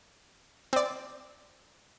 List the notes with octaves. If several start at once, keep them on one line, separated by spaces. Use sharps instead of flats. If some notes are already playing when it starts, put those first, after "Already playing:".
C4 D5